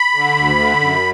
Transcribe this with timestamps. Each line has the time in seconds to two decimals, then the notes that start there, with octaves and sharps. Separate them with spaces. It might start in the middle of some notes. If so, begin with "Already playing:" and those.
Already playing: B5
0.15 D3
0.36 D2
0.59 D3
0.80 F#2